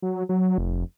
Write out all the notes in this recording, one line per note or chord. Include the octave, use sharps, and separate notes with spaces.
F#3
F#3
F1